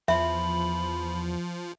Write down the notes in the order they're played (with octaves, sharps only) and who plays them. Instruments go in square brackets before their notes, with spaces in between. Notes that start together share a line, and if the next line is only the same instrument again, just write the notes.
[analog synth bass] E2 [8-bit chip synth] F3 [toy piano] E5 [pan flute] B5